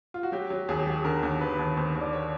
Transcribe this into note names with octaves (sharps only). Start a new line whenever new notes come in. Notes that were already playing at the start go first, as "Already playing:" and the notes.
F4
F#4
F#3 G4
F#3
D#2 G#4
G4
F#3 G#4
D3 A#4
D#2
D#2 B4
D#2
D#2 C5
D#2
D5
C#5